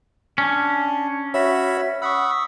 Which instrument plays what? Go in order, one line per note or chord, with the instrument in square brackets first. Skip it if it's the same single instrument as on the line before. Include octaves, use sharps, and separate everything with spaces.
[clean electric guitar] C#4 [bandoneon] D4
[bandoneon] F#4 B5 E6 [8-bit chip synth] C#5 E5
[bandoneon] F#5 B5 [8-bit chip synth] C#6 D#6 E6